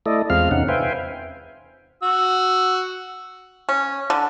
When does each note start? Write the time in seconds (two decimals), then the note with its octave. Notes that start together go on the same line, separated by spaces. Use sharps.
0.06 A3 E4 A4 D5 D#5
0.30 E2 G#3 C4 F4 F5 F6
0.51 E2 C3 C#4 D#4 F#5
0.68 B4 C5 E5 F5 G5 G#5
2.03 F#4 E6
3.69 C#4
4.10 D3